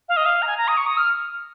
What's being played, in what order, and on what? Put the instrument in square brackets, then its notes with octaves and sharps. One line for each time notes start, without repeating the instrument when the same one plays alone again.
[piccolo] F5
D#5
F5
A#5
G#5
A#5
D#6
C#6
D#6
F6